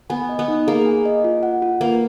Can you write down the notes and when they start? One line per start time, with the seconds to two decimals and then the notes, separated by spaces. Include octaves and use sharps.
0.10 B3 G#5
0.29 D#5
0.39 B3
0.48 D#4
0.67 A#3 G#4
0.86 G#5
1.06 D#5
1.24 F4
1.43 F#5
1.62 F4
1.81 A#3 B4